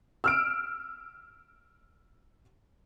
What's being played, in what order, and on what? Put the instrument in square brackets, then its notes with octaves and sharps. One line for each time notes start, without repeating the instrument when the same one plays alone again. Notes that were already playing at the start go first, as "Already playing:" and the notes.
[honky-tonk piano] E6 F6 D7